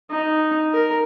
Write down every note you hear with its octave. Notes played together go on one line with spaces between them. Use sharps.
D#4
A#4